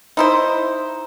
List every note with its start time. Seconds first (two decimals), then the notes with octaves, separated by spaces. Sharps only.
0.17 D#4 E4 C5